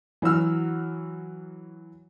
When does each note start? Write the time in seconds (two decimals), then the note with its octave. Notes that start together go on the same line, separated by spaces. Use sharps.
0.22 E3 F#3 F#4 E6 F6